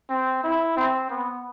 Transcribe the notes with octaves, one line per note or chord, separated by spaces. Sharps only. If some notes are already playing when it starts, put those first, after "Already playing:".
C4
E4
C4
B3